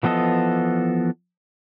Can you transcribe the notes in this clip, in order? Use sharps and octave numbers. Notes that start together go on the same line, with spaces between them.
E3 F3 B3 A4 D#5